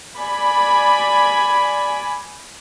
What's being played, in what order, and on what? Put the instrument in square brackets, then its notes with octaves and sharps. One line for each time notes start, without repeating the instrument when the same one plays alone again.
[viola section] D5 G#5 B5